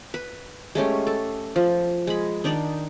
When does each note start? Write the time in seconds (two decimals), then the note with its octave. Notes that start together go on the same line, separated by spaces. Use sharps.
0.14 B4
0.75 G#3 A3 C#4 G4
1.07 A4
1.56 F3
2.07 G#3 B5
2.44 D#3 D4 D#4 D5